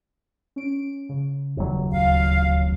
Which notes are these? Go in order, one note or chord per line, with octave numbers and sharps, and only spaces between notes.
C#4 D7
C#3
D#1 F#3
D2 F5